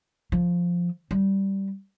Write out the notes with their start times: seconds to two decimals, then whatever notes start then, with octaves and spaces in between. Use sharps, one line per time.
0.32 F3
1.11 G3